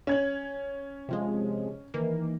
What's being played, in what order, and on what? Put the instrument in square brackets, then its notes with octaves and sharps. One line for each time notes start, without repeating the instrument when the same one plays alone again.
[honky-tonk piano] C#4 G#6 F#7
[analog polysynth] C3 F3 G#3
D#3 E3 A#3